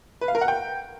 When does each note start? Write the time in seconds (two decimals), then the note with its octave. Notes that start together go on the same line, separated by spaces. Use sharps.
0.21 B4
0.28 F5
0.35 A#4
0.41 F#5
0.48 G5